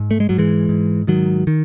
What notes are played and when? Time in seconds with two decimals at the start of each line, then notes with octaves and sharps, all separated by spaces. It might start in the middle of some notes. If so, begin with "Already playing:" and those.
Already playing: G#2
0.11 A3
0.20 G#3
0.29 G#2 F#3
0.38 E3 G#3
0.69 G#2
1.07 G#2 D#3 F#3
1.47 D#3